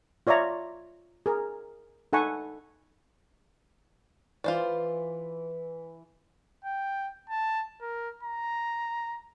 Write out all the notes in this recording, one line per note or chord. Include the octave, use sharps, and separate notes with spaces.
F4 C#5 D5 E5 A#5
G#4 A#4
D#4 A4 F#5 G#5 B5 C#6
E3 F4 C5 D5
G5
A5
A#4
A#5